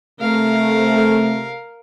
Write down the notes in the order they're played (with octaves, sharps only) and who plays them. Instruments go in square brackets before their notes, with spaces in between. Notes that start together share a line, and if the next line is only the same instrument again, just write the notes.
[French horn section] C3 A3 [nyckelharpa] A#4 F5